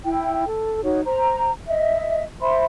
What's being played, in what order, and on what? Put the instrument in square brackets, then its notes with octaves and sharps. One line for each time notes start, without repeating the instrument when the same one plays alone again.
[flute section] E4 G5
A4
D#4 F#4 C#5
C5 A#5
D#5 E5
C5 E5 B5 C6